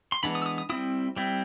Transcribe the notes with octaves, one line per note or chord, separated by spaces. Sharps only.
C6
E3 G#3 B3 D4 B5
D#6
E6
D#6
D#6
G3 C4 E4 D#6
G3 C4 E4